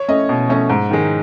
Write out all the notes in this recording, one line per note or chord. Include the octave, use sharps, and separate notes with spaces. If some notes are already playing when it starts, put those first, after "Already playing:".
Already playing: C#5
A3 C#4 D#5
B2
A3 C#4
G#2
D#3 G#3